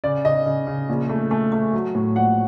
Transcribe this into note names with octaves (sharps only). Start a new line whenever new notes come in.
C#3 D5
C#3 D#5
C#3
C#3
A#1
A3
A3
A3
F#3
A2
A#1 F#5